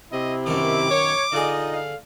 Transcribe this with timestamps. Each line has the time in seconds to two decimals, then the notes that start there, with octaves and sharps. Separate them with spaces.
0.12 C3 E4 D#5
0.46 F#2 B2 D#3 D6
0.91 C#5
1.32 D3 D#4 F4 G#4 D#5
1.72 F5